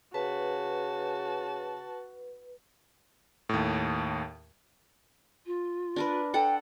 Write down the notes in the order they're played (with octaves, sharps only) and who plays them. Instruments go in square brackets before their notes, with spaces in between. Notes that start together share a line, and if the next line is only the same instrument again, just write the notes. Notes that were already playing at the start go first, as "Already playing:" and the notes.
[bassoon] C#3 [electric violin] F#4 [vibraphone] B4 [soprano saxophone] A5
[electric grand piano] D#2 A2
[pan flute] F4
[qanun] D4 A#4 B4
[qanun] A4 F#5 [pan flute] G5